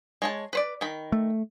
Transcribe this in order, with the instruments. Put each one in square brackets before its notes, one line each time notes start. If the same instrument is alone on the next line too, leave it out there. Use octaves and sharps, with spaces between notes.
[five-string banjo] G#3 C#5 A5
B4 C5 D5
D#3 B5
[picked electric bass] A3